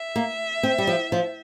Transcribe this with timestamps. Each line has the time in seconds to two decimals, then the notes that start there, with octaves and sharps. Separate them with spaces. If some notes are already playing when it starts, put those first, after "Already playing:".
Already playing: E5
0.16 A#3
0.63 C4
0.78 G3
0.87 F3
1.12 F3